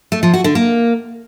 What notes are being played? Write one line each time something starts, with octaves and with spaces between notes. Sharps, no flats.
A3
F3
F#4
D3
A#3